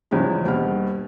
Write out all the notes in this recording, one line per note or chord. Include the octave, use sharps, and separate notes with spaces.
E2 C#3 F3 G3 G#3
D#1 G2 B2 F6